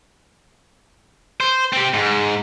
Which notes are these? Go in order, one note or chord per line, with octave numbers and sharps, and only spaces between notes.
C5
C4 G4
G#2